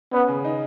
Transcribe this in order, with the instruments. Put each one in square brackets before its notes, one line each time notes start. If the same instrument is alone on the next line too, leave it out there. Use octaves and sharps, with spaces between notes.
[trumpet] B3 [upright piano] C#4
[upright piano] C#3
D#4